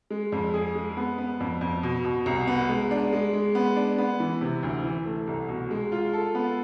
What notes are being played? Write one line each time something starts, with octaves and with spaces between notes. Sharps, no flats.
G#3
F2
G#4
G#3
B3
B3
F2
F2
B2
B2
C2
B3
G#3
D4
G#3
G#3
B3
D4
B3
E3
C3
D2
E3
A3
C2
B2
G#3
F4
A4
B3